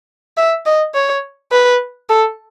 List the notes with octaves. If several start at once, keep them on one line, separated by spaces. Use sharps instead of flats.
E5
D#5
C#5
B4
A4